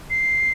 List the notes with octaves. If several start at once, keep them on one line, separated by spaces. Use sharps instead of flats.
C7